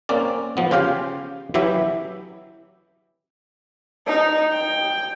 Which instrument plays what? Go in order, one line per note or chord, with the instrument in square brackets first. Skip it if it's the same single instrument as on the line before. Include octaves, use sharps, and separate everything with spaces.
[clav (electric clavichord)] A#3 C4 C#4 D5
F3 B3
C#3 F4 G4 F5 G5
E3 F#3 E4 G4 E5
[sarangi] D#4
G5